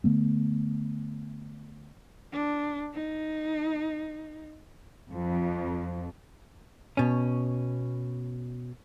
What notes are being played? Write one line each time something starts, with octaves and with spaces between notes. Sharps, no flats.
D3 A3 B3
D4
D#4
F2
B2 C#4